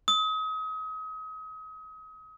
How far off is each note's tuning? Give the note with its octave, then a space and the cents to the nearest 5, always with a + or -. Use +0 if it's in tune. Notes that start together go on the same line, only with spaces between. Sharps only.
D#6 +35